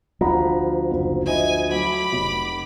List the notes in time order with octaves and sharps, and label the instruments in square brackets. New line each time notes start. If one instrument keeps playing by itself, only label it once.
[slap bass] D2 F3 [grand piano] F#5 A#5 B5
[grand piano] F#1
[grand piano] E4 D#5 [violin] G#5
[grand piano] F#3 A3 [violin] B5 D6
[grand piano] F1